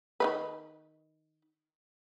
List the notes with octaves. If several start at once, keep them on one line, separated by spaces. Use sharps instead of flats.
D#3 A3 B4